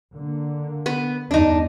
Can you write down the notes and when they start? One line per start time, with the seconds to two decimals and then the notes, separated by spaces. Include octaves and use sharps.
0.15 D3 A#3
0.86 B3 B4
1.31 E2 G2 D4 D#4